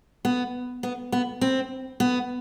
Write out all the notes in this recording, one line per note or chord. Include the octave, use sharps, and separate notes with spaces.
B3
B3
B3
C4
B3